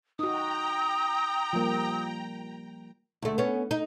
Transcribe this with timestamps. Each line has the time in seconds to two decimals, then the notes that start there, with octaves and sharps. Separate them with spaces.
0.19 D#4 F#4 G5 A#5 D#6
1.53 F3 G3 A#3
3.22 D2 A3
3.38 B3 C#4
3.71 D#4